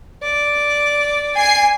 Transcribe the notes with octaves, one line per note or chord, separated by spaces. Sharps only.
D5
G#5 C7